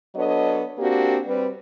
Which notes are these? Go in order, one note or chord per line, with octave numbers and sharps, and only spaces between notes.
F#3 B3 D4 A4 C#5 D#5
A#3 C4 D4 F#4 G4
G3 C4 B4